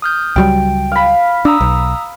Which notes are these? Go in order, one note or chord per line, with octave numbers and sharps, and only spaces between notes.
D#6 F6 G6
C#2 F#3 G3 G5
F5 B5
D4 A#5 D#6 E6
B1